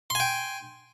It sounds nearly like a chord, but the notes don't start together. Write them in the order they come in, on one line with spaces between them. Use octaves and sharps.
C6 G#5 G5